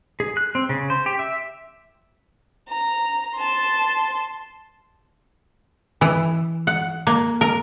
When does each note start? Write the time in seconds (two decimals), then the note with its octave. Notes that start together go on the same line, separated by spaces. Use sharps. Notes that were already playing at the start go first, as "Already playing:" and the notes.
0.20 G#4
0.37 F#6
0.55 C4
0.69 C#3
0.90 C5
1.06 G4
1.19 E5
2.69 A#5
3.36 A5 C6
6.01 E3
6.67 F#5
7.07 A#3
7.41 A#4